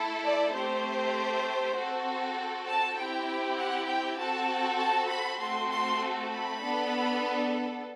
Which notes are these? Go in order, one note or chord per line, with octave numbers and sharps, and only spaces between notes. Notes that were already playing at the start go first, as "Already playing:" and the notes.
Already playing: A3 E4 A4
D5
A3 C4 G4 C5
C4 F#4 A4
A5
C4 E4 G4 G5
F#5
G5
C4 F#4 A4 A5
A5
B5
A3 C4 F#4 A4 C6
C6
B5
B3 D4 A4